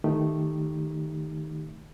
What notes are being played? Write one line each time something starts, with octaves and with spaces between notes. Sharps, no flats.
D#3 A3 D#4 G4